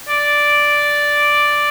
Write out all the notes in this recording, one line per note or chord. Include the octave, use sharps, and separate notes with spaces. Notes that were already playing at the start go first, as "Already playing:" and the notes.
D5